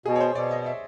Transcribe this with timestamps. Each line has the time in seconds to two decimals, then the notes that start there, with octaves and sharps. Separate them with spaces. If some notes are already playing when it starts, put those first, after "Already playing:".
0.06 B2 G#4
0.16 C#5
0.21 C5
0.35 B2 D5
0.51 D#5
0.66 E5